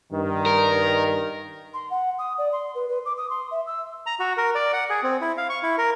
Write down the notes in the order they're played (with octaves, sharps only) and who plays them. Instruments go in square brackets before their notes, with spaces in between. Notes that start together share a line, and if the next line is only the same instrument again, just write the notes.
[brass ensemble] G2 D#3
[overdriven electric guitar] A#4
[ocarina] C6
F#5
D#6
D5
C6
B4
B4
D6
D#6
C6
E5
E6
[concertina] A#5
F#4
A#4
D5
F#5
G#4
C4
E4
F5
C#6
E4
A#4